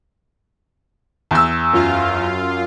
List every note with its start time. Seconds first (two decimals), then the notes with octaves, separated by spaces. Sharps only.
1.31 E2 E6
1.73 F#2 F4 F5